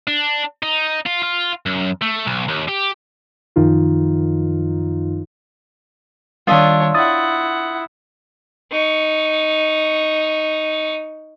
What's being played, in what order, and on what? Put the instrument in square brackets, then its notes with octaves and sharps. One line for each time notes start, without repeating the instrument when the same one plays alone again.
[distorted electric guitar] D4
D#4
F4
F4
F#2
A3
B1
D#2
G4
[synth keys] F#2 D#3 F3 D#4 F4
[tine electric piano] D#3 G3 [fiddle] D4 C#5 [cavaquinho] F4 D#5 E5
[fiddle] E4 F#5 [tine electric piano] D#6 A6
[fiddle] D#4 C#6